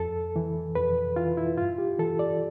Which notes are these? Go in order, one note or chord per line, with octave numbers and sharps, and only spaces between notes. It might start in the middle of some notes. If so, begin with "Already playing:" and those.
Already playing: F2 A4
E3
F2 B4
E3 F4
E4
G2 F4
G4
E3 A4
D5